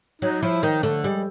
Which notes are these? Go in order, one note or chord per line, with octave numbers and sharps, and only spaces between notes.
F#3 D#4
F3 E4
D#3 D#4
D3 A3
G3 G#3